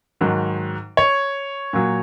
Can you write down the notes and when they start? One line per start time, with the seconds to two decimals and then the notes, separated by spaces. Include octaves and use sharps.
0.21 G#2 D#3 F#3
0.97 C#5
1.73 A#2 F#3